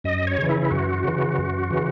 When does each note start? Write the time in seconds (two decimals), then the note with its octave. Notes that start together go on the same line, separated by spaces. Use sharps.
0.04 F#2 D#5
0.27 C#5
0.38 C#3 E3
0.49 E4
0.62 E4
0.71 F#2 F#4
1.05 C#3 E3
1.38 F#2
1.70 C#3 E3